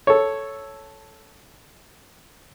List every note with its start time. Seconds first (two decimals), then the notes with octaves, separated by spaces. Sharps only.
0.07 A4 C#5